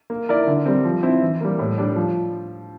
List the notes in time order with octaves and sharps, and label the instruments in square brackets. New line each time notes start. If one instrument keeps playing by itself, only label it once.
[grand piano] A#3
E4 A#4 D5
D3
G3 C4
F3
C4 E4
E3
G3 A#3
A2
G3 D4
F3